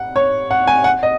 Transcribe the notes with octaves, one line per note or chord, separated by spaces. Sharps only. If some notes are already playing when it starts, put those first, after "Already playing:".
Already playing: F#5
C#5
F#5
G#5
F#5
D#5